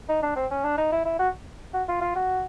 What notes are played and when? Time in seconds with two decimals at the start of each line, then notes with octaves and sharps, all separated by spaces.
0.09 D#4
0.23 D4
0.36 C4
0.51 C#4
0.64 D4
0.78 D#4
0.92 E4
1.05 E4
1.19 F#4
1.74 F#4
1.89 F4
2.02 F4
2.15 F#4